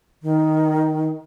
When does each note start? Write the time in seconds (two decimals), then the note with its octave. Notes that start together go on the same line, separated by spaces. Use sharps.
0.23 D#3